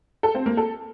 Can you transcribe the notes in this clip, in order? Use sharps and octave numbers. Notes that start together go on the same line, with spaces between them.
A4
C4
A#3
A4